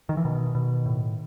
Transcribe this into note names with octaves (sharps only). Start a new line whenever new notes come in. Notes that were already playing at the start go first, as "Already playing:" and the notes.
D#3
E3
B2 D#3
B2
A2